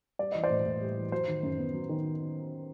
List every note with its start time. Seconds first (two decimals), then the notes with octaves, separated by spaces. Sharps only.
0.19 G3 D5
0.32 E3 D#5
0.44 C5 D5
0.50 A2
0.66 A2
0.81 G3
0.96 E3
1.12 F#3 C5
1.28 D#3
1.43 F#2
1.58 B3
1.74 F#3
1.89 D#3